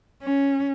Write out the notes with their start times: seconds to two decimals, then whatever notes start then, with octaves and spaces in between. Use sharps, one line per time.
0.22 C#4